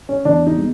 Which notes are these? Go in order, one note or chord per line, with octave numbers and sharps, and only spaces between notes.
C#4
E2 D4
D#4
B2 G#3